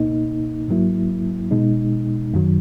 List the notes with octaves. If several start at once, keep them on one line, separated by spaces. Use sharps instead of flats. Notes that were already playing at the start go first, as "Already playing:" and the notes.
Already playing: C#2 B2 A#3 D#4
G#2 F#3 A#3 E4
B2 G#3 D#4
F#2 D#3 F#3